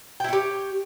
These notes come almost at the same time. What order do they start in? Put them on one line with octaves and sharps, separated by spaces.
G5 E4 C#5 G4